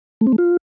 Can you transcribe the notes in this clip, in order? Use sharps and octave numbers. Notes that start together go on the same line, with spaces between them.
A3
C4
A3
F4